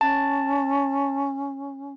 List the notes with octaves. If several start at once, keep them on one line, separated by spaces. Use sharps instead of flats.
C#4 A5